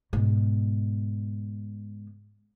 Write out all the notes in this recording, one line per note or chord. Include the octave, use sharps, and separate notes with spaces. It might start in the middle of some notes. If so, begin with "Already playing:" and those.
G#2 B2